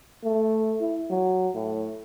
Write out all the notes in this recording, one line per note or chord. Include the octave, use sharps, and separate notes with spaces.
A3
E4
F#3
A2